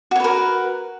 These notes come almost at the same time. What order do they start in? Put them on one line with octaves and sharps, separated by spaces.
F#4 C#5 B4 A#4